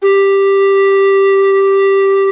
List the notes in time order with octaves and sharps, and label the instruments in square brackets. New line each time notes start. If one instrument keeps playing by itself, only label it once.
[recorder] G4